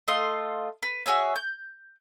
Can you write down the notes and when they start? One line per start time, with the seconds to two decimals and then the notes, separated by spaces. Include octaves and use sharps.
0.08 A3 F4 D#5 C6
0.83 B4
1.06 F#4 G#4 C#5 E5
1.36 G6